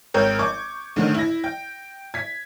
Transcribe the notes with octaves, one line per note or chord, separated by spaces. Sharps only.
G#1 A#4 C#5 G5 G6
C#6 D6 G#6
D2 A2 D3 D#3
E4 A#6
G5
G#6 B6